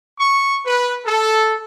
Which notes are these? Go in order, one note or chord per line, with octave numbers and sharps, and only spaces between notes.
C#6
B4
A4